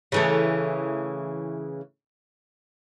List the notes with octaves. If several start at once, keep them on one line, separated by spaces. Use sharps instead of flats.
C#3 E3 A3